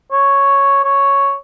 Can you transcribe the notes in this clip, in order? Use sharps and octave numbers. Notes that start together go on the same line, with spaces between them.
C#5
C#5